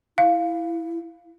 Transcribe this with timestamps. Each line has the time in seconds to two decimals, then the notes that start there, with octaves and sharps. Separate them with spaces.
0.18 E4 F5